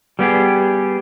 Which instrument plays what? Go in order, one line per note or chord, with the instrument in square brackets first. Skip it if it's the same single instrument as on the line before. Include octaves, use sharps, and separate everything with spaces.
[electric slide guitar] G3 B3 G4 G#4